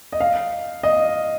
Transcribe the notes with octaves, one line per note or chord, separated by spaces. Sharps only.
D#5
F5
D#5